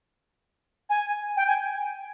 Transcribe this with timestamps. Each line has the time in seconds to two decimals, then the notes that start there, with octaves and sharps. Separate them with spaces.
0.90 G#5
1.37 G5
1.47 G#5